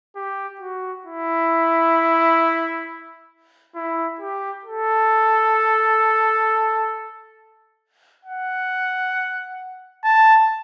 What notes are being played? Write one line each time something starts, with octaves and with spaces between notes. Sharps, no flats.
G4
F#4
E4
E4
G4
A4
F#5
A5